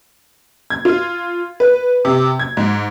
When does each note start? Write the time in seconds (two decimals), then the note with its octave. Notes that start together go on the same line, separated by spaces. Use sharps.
0.70 G#6
0.85 F4
1.60 B4
2.05 C3
2.39 G#6
2.57 G#2